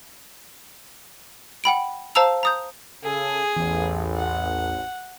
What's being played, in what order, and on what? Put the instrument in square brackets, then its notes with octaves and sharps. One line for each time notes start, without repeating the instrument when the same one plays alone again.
[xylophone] F#5 G5 B5 D7
C5 F5 A5 A#5 E6 F7
A#5 D#6 G6
[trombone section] C#3 A4 [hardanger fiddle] G#4
[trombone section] A1 [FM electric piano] E2
[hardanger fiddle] F#5